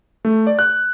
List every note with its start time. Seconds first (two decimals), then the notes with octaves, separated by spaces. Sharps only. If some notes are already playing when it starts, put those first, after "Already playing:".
0.25 A3
0.47 D5
0.59 F#6